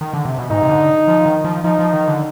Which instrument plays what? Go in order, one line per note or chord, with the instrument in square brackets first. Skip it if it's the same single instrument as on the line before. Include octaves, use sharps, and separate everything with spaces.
[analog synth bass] D#3
D3
C3
B2
[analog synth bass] G#2 [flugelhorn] D#4
[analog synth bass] C3
D3
F3
D#3
F3
[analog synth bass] F3 [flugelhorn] D#4
[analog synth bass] F3
D#3
D3